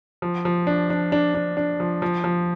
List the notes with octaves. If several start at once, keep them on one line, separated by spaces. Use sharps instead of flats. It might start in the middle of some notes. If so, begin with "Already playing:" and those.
F3
F3
D4
D4
D4
D4
D4
F3
F3
F3